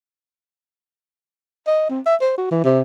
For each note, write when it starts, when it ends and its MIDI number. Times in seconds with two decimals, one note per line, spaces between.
1.67 1.85 75
1.90 2.00 60
2.06 2.15 76
2.21 2.33 72
2.38 2.48 66
2.51 2.63 52
2.64 2.82 48